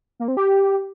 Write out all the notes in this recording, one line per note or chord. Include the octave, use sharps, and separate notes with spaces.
A#3
C4
G4